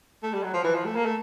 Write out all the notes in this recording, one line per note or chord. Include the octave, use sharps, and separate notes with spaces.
A3
G3
F#3
F3
E3
F3
A3
A#3
A3